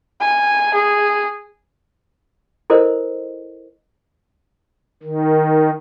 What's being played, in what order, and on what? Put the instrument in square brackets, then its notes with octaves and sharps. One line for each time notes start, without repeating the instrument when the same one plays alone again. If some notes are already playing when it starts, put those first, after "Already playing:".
[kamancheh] G#5
G#4
[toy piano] E4 A4 A#4 C5 D#5
[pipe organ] D#3